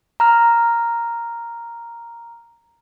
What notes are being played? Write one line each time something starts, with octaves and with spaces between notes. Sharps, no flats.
A#5 F6